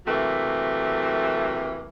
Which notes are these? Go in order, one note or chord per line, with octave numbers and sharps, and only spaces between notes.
C3 E3 F#3 A3 A#3